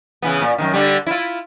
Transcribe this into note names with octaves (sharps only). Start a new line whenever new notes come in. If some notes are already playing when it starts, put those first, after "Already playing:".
C#3 E3 B3
A#2
F#2 C3 D#3
D3 G3
E4 F4